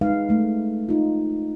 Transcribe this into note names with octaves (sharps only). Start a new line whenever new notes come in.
G#3 D#4 B4 F5
G#3 A3
D#4 F4